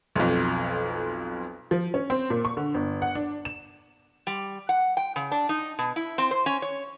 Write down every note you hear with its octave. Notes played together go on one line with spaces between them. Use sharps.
B1 F2
F3
C#4
C4
A#2
C#6
D3
G1
F#5
D4
E7
G3
F#5
G5
C#3
D4
D#4
B2
E4
C4
C5
C#4
C#5